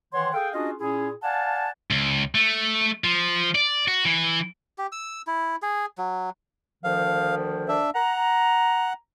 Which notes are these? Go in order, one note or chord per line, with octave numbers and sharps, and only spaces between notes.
D#3 E3 C#5 F#5 C6
G#4 A4 F5 G5
C#4 D4 F4 F#4 G#4 D#5
A#2 C#4 E4 G#4
D5 F5 F#5 G#5 A5
C#2
A3
F3
D5
F#4
E3
G4
E6
E4
G#4
F#3
D2 D#3 F3 F5
D4 E5
F#5 A#5